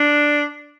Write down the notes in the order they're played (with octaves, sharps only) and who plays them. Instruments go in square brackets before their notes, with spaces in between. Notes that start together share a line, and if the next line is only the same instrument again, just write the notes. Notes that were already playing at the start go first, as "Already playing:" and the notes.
Already playing: [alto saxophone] D4